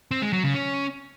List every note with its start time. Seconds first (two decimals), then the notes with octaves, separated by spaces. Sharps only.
0.11 C4
0.22 G#3
0.33 F#3
0.44 C#3
0.54 C#4